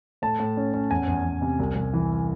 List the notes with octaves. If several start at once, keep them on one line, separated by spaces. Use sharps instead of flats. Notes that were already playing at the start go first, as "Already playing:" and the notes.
A2 A5
A2
C#4
C#4
E2 G#5
E2
E2
C3
C2
C2
E3